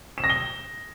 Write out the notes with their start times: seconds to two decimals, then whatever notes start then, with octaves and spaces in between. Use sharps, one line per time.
0.18 E7
0.24 A#6
0.30 G7